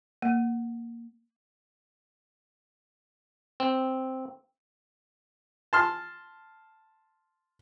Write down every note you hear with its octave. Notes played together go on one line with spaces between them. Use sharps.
A#3
C4
A5 C6 F6